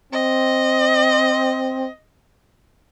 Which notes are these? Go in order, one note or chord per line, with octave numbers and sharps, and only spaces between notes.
C4 D#5